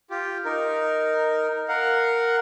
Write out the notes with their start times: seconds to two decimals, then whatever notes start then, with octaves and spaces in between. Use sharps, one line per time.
0.10 F4 G4
0.45 D#4 A#4
1.68 A#4 F5 F#5